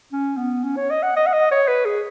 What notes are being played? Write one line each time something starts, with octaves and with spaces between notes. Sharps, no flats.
C#4
B3
C#4
C#5
D#5
F#5
D#5
F#5
D#5
C#5
B4
G#4